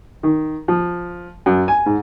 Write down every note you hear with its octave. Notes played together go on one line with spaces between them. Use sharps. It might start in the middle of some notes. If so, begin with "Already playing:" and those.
D#3
F3
F#2
G#5
G#2